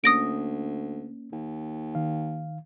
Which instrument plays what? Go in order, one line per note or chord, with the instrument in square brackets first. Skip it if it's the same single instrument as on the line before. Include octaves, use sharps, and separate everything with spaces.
[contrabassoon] D2 [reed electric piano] A#3 C#4 [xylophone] D#6 A#6 D7
[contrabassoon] D#2
[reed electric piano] D#3 F5